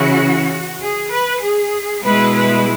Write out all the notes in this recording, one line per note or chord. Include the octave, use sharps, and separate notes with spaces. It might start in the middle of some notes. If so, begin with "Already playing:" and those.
Already playing: C#3 E3 C#4 E4 F#4
G#4
B4
G#4
B2 G#3 E4 B4
B4